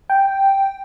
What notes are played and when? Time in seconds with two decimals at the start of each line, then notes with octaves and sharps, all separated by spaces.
0.10 G5